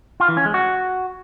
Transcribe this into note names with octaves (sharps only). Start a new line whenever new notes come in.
F4
E3
C#4
G#3
F#4